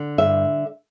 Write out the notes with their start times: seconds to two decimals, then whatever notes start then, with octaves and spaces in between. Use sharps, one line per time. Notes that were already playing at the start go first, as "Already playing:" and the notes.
Already playing: D3
0.18 G2 E5